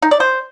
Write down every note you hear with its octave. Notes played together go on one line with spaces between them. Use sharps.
D#4
D5
C5